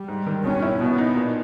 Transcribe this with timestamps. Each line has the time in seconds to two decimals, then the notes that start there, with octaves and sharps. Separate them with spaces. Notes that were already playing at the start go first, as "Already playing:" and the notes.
Already playing: G3
0.08 G#2
0.27 D#3
0.44 B2 C#4
0.62 E4
0.80 B2 B3
0.98 D#4
1.16 A#2